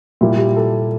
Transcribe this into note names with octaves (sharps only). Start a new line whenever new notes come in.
A#2 G3 E4
G4
A4